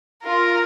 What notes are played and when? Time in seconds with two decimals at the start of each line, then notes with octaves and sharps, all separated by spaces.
0.24 F4 A#4